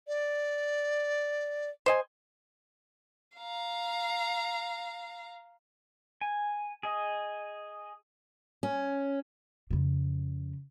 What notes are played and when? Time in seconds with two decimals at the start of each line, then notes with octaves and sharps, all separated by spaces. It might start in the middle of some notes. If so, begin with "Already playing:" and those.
0.08 D5
1.86 C5 D#5 G#5
3.37 F5 A#5
6.21 G#5
6.83 G#4 D#5
8.63 C#4
9.71 F2 C#3